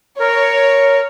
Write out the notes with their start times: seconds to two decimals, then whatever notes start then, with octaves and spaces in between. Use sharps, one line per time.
0.20 A#4 C#5